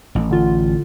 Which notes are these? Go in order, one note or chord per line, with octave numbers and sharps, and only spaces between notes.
A1
D3 F4